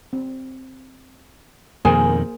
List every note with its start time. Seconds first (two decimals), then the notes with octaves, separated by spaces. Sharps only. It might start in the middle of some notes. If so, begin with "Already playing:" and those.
0.13 C4
1.85 F2 B2 D#3 A#3 G#4 A#4 C5 G#5